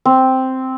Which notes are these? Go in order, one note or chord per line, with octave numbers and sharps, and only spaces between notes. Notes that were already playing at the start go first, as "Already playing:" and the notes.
C4